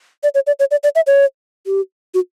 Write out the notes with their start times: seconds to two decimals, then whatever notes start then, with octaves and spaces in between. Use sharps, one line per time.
0.23 D5
0.35 C#5
0.47 D5
0.60 C#5
0.71 D5
0.83 D5
0.95 E5
1.07 C#5
1.66 G4
2.14 F#4